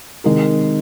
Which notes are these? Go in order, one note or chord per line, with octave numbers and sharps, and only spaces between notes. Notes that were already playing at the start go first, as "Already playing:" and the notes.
C3 D#3 G#3 D#4 A#4